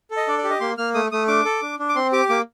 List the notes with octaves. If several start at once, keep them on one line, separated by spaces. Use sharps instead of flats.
A4
D#5
D4 D5
D5
G4
D#5
A#3 C6
A#3 F6
A3 D#6
A3 D#6
D4 D6
A4
D4
D4
D6
C4 C6
G4 D6
A#3 D6